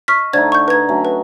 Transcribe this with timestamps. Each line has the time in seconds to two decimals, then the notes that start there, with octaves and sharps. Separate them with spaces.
0.08 D#5 C#6 F6 B6
0.33 D3 A3 D#4 C5 D5 G#6
0.52 C#6 G6
0.68 B4 A#5 G#6
0.89 F#3 A3 C#4
1.05 B4